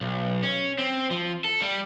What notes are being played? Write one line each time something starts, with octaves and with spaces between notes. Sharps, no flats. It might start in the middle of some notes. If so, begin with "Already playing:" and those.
B1
C#4
C4
F3
A4
G3